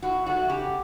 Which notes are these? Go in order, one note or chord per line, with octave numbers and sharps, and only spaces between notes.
A2 F#4
F#3 A3 F#4
C#3 G4